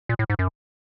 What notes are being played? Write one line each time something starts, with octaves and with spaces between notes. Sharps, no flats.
A#2
A2
G#2
F#2